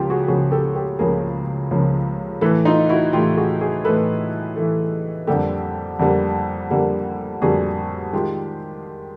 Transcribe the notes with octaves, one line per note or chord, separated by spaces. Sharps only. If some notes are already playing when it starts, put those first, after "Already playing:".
Already playing: C#2 C#3 F3 A#3 F4 G4
F#4 G#4
C#2 C#3 F3 A#3 F#4 G#4
G4 A4
G4 A4
C#2 C#3 F3 A#3 G#4 A#4
C#2 C#3 F3 A#3
A2 E3 A3 A4 B4
D#4 F4
E4 F#4
A2 E3 A3 F4 G4
F#4 G#4
F#4 G#4
A2 E3 A3 A4 B4
A2 E3 A3
F2 D3 G3 A#3 G4 A4
F2 D3 G3 A#3
F2 D3 G3 A#3
F2 D3 G3 A#3 F#4 G#4
D#3 G#3 F4 G4